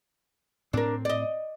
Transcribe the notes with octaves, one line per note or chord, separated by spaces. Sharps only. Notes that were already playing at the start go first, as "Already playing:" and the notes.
A2 C4 D4 A#4
D5 D#5